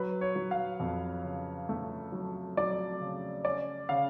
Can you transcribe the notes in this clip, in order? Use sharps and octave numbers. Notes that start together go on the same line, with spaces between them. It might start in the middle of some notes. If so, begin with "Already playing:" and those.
Already playing: F#3 B4
C#5
F#3
F5
F2
C#3
A3
F#3
F#3 D5
C#3
C#4 D5
C#3 F5